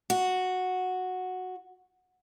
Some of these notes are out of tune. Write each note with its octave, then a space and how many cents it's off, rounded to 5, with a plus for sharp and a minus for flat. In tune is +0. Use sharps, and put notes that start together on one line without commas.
F#4 -5